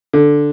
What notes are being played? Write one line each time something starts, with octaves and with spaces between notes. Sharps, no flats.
D3